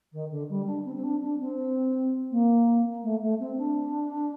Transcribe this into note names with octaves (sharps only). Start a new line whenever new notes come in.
D#3
D3
G3
D4
C4
C4
D4
D4
C4
A#3
A3
A3
C4
D4